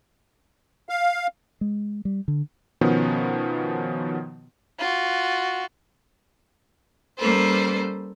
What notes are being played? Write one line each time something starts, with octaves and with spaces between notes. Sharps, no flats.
F5
G#3
G3
D3
B2 D#3 F3 B3 C#4
F4 F#4
G3 A#3 C#4 A4 B4 C5